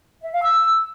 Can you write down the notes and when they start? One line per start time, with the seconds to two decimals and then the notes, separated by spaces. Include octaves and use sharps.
0.22 E5
0.33 F5
0.43 E6